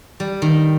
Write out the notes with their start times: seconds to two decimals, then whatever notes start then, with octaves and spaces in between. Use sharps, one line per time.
0.20 G3
0.42 D#3